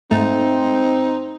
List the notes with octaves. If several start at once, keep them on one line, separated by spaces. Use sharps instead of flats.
G#2 A3 C4 D#4